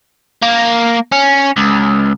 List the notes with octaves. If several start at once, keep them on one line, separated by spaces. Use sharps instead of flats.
A#3
C#4
C#2